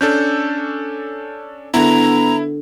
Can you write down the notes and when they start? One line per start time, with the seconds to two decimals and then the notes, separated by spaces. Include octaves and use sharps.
0.01 C#4 D4 A4 G6
1.74 D3 B3 D4 E4 F#4 A#5